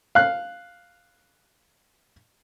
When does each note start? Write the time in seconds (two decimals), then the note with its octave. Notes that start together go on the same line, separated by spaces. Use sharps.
0.15 F5 F#6